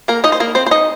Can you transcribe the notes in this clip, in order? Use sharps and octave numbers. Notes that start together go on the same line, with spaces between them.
A#3 A#4
D#4 D#5
C5
A#3 A#4
C4 C5
C5
D#4 D#5